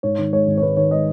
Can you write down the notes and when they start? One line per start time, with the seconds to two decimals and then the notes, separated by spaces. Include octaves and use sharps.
0.03 G#2 C#5
0.18 D#3
0.33 G#3 C#5
0.47 G#1
0.58 C#5
0.62 G#2 B4
0.77 D#3 C#5
0.91 G#3 D#5